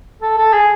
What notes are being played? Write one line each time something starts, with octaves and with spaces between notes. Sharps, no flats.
A4
A4
G#4